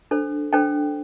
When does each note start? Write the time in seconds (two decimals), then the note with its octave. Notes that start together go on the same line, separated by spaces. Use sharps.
0.11 D4 A4 C5
0.53 D4 A4 C5 G5